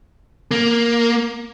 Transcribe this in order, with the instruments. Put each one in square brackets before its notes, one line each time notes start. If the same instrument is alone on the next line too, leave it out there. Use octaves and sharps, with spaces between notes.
[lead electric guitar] A#3